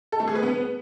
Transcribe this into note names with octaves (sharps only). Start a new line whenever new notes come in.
A4
A3
G#4
B4
B3